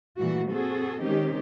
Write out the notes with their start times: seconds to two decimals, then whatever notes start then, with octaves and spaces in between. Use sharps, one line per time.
0.18 A#2 E3 G3 A3 F#4
0.51 C4 F#4 G#4 A4
1.01 D#3 G#3 C4 C#4 D#4 G4